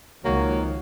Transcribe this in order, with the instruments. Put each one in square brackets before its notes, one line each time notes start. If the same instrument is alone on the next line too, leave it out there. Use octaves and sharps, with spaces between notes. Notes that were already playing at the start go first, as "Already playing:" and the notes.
[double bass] C#2 [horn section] D#3 F3 F#4 [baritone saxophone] A#3 [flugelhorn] C#5